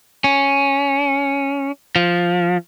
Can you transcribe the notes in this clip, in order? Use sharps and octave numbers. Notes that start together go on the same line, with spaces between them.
C#4
F3